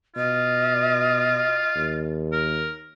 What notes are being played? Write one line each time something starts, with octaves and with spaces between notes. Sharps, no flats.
B2 F4 D#5
D#2
A#4